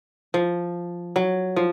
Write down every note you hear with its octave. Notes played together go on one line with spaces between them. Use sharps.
F3
F#3
F3